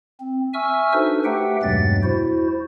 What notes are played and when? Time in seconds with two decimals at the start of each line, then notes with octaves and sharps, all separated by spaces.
0.20 C4
0.54 E5 G#5 C#6 E6 F6
0.93 D4 D#4 F#4 A4 B4 C5
1.25 A3 G4 B4 E5 F#5 G5
1.63 E2 G2 B2 F#3 G#3 A6
2.03 E4 F#4 C5